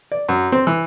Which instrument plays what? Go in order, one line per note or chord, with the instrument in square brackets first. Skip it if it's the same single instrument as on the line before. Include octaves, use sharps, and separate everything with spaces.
[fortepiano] D5
F#2
C4
E3